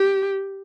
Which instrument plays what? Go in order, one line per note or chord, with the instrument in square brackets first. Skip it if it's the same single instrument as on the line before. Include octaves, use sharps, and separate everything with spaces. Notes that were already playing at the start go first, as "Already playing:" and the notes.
Already playing: [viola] G4